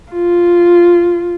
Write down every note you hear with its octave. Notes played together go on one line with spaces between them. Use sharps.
F4